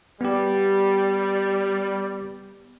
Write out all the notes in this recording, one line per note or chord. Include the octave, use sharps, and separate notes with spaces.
G3 B3 G4